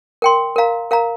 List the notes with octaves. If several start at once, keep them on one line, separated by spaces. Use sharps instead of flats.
A#4 G5 C6
A#4 F5 A#5
A#4 F5 A#5